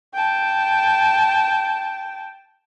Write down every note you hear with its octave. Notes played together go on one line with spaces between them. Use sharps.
G5 A5